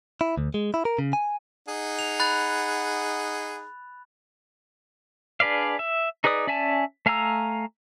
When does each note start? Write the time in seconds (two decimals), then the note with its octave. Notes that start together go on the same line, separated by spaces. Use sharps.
0.21 E4
0.37 D2
0.54 G#3
0.74 E4
0.85 A#4
0.99 C#3
1.13 G#5
1.68 D#4 G#4 F#5
1.99 F7
2.20 B5 F#6 A6
5.40 D4 G#4 B4 D5 F5
5.79 E5
6.24 D#4 G#4 B4 D5 D#6
6.47 C#4 D5 E5 G#5 A5
7.06 A3 F5 G#5 A#5 E6